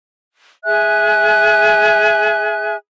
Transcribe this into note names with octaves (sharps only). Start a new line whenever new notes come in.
G#4 E5 G#5 F#6